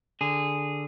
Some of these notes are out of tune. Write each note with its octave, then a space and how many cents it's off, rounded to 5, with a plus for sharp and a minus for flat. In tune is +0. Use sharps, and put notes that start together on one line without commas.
D3 +0 G#4 -10